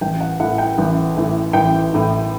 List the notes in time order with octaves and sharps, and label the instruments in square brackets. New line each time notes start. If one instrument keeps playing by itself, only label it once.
[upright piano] A1 G5
F#5
A2 E3 F#5
G5
A1
A2 E3
A1 G5
A2 E3